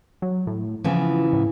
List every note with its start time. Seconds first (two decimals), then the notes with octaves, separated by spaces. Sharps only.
0.22 F#3
0.47 A2
0.84 C#3 E3 F3 B3
1.33 A2